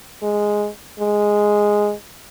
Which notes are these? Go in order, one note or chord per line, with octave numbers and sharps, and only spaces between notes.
G#3
G#3